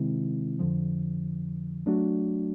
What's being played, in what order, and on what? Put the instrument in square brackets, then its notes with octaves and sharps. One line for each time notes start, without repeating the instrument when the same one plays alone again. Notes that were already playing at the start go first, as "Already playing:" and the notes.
Already playing: [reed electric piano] C3 D#3 G#3 C4 E4
F2 D3 F3
F#3 A3 D4 F#4